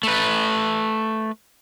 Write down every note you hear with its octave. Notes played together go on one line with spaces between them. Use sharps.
A3 B4